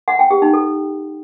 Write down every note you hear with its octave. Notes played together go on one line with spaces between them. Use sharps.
F#5
G5
G4
D#4
A4